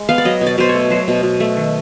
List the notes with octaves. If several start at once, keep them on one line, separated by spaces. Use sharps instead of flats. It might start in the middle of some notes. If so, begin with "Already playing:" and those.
Already playing: G#3
B3 F5
D5
F#3 D#5
B2
D5
B2 C5
C#5
A3
F#3 C5
B2
B2
A3
D#3